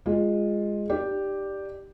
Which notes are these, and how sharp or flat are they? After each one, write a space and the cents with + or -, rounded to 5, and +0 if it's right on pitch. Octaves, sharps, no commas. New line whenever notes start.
G#3 -10 F4 +0
D#4 -30 G4 +0 D5 +0